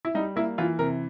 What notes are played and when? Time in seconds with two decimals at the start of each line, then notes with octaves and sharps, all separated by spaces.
0.05 E4
0.15 G3 D#4
0.36 A#3 E4
0.58 E3 F4
0.79 C3 A#4